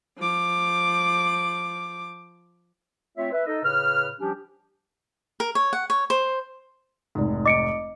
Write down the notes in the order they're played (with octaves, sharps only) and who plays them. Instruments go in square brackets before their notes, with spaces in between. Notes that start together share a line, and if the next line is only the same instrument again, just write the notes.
[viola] F3 D6
[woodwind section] A3 C4 F4 C#5 E5
B4 E5
D#4 A4 D#5
A2 C#3 B4 F6
F3 G3 C#4 D4 G4
[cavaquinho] A#4
C#5
F#5
C#5
C5
[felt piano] F1 G#2
[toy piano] D#5 [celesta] D6 C#7 D7